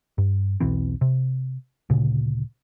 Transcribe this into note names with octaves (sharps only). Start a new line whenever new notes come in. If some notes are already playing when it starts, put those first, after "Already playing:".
G2
B1 E2 E3 C4
C3
D2 A#2 C#3